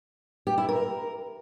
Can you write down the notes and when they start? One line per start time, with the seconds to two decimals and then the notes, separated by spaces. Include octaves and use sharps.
0.47 G4
0.58 E4
0.69 A#4